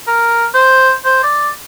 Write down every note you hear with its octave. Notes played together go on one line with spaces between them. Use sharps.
A#4
C5
C5
D5